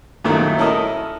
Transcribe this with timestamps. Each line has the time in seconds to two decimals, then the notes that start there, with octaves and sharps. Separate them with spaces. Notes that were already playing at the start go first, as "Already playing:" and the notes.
0.24 C2 F#2 A#2 D#3 A3 E4
0.58 C#4 E4 A4 A#4 D#5